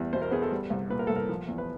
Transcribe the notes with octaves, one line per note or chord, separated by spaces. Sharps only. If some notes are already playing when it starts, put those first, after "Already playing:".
Already playing: E2 G3
B2 C5
A#4
B3 G#4
A4
G3
C2
A#2 B4
A#4
C2 A4
A#4
F3
E2
B4